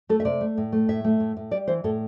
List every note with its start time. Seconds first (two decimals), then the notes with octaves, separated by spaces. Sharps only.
0.09 A3 A4
0.20 E5
0.25 C3 D5
0.41 A3
0.58 A2
0.72 A3
0.89 A2 E5
1.05 A3
1.20 A2
1.37 A2
1.51 G3 D5
1.68 E3 C5
1.84 A2 A4